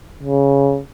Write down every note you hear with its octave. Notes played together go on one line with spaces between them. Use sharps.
C#3